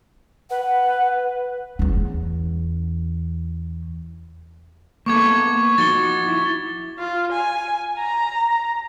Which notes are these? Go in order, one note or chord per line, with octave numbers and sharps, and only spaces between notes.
B4 F#5
E2 C#4
A#3 B3 A4 C#6 D6 G#6
F3 D#4 F#4 A6 G7
E4
F4
G#5
A#5